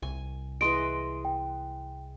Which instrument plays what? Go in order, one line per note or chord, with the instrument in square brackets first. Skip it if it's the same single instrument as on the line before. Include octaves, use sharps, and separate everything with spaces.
[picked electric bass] C2 [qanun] G#5
[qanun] E3 G#3 D#5 [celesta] C6 D7
[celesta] G5